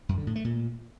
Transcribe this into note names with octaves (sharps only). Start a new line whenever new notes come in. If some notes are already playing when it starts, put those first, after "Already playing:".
F#2
D3
A2
A3
A#2